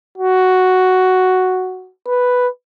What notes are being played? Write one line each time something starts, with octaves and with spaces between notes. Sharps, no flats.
F#4
B4